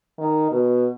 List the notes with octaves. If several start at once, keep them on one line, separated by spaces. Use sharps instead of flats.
D#3
B2